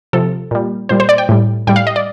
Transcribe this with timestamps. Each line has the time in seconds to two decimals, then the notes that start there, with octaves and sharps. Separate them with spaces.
0.13 C3 F3 A4
0.51 A#2 G3
0.89 A#2 G3 C5
1.00 C5
1.09 D5
1.18 G5
1.29 A2 G3
1.67 A2 G3 G5
1.76 F5
1.87 D#5
1.96 D5